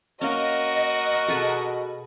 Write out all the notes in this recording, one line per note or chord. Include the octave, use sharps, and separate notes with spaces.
A#3 C#4 F#4 A#4 D#5
B2 G#4 A4 B4